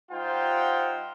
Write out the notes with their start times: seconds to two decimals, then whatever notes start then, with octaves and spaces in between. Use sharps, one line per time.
0.11 G3 D#4 F4 C5 F#5 G5